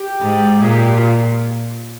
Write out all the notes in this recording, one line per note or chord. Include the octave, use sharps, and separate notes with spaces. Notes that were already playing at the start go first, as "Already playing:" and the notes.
Already playing: G4
G#2
A#2 G#4
G4
F4